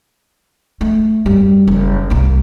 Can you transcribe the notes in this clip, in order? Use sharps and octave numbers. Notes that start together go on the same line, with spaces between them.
A3
F#2 G3
F#1
C2 A#3